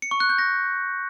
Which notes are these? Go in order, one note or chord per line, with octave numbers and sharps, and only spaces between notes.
C#7
C#6
F#6
G6
A#6